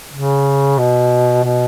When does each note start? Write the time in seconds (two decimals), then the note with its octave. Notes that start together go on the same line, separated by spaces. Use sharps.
0.14 C#3
0.78 B2
1.44 B2